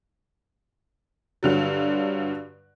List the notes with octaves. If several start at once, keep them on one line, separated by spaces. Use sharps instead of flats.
G2 D3 F#3